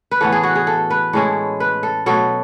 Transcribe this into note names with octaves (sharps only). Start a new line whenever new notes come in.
B4
A2 E3 B3 A4
G#4
F#4
G#4
A4
B4
A2 G#3 C#4 E4 A4
B4
A4
B2 F#3 A3 A4